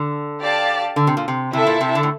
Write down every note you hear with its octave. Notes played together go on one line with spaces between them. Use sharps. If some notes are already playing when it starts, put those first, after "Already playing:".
Already playing: D3
G4 D5 F5 A5
D3
C3
A#2
C3
C3 E4 A4 E5 A5
A#2
C3
D3
A2